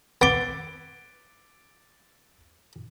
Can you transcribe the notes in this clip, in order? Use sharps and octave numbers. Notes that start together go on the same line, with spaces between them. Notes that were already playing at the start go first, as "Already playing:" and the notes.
B3 D6 A6 D7 G7